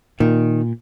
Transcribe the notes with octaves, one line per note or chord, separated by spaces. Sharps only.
A#2 D#3